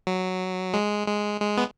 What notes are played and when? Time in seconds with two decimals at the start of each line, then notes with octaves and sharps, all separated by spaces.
0.07 F#3
0.74 G#3
1.08 G#3
1.41 G#3
1.57 B3